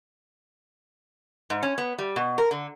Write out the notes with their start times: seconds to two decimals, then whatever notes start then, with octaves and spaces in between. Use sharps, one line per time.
1.50 G#2
1.63 C#4
1.78 B3
1.98 G3
2.16 B2
2.38 A#4
2.51 D3